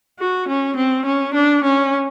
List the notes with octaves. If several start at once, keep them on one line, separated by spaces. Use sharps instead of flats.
F#4
C#4
C4
C#4
D4
C#4